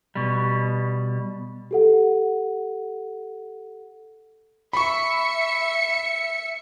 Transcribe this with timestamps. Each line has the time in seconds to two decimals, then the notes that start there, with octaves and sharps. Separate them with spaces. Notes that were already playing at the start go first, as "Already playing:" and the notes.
0.15 B2 G3
1.71 G4 A4 F#5
4.73 E5 B5 C#6 C#7